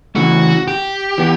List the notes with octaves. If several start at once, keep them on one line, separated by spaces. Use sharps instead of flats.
C#3 E3 A3 F#4
G4
E3 B3